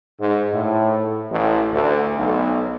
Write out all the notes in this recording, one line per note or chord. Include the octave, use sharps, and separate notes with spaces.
G#2
A2
A1
D2
B1